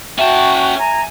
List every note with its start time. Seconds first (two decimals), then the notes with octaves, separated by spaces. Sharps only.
0.19 C#4 F#4 E5 G5 A5
0.78 G#5 A#5